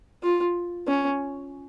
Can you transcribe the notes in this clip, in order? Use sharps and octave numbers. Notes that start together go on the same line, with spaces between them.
F4
C#4